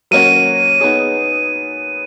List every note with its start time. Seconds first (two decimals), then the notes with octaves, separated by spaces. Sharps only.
0.11 F#3 A#3 C#4 F#4 D#7
0.80 B3 D#4 G#4 C#5